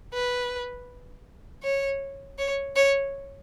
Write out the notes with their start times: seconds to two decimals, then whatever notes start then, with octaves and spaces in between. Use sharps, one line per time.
0.13 B4
1.63 C#5
2.39 C#5
2.76 C#5